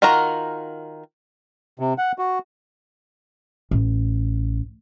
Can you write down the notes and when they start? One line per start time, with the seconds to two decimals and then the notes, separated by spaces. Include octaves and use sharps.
0.02 D#3 F4 F#4 A#4 A#5
1.80 C3
1.98 F#5
2.19 F#4
3.71 A1